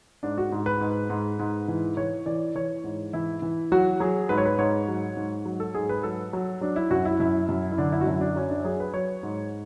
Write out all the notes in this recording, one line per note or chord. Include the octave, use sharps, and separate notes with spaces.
G#2 D4
F#4
G#2
B4
G#2
G#2
G#2
E3
E3 C#5
E3 D5
E3 C#5
G#2
E3 E4
E3
F#3 F#4
F#3 G#4
G#2 B4
C#5
B4
G#2 C#5
F#3
G#2
F#3
A4
G#2 G#4
B4
F#3 A4
F#3
F#3 D4
E4
F#2 F#4
E4
F#2 E4
F#2
E4
D3 D4
E4
F#4
F#2 E4
D4
F#3 C#4
D4
F#3 G#4
B4
F#3 C#5
G#2